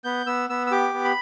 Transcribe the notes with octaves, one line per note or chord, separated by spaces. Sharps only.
B3 G6
B3 E6
B3 E6
E6
G4 D6
B3
B5